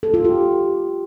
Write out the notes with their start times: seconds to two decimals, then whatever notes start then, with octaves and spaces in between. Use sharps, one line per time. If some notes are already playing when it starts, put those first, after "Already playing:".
0.03 A4
0.14 F4
0.25 G4